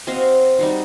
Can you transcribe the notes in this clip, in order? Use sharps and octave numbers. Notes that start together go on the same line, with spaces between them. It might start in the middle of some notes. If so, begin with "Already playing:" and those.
C4 F#4 D#5 F5
G3 D#4 F#4